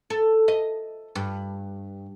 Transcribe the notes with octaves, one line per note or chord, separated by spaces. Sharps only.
A4
D#5
G2